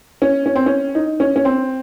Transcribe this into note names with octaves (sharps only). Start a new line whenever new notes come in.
C#4
C#4
C4
C#4
D#4
C#4
C#4
C4